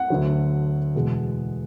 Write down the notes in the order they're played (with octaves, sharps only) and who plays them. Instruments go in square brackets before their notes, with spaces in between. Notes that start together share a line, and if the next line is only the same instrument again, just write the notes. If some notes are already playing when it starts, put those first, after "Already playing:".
Already playing: [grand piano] F#5
D2 D3 F#3
E2 B2 G#3